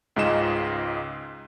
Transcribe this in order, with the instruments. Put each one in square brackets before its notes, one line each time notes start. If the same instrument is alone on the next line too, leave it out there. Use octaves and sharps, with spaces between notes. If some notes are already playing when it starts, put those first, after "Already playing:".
[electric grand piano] C#2 G#2 G#3 F4 D#5 E7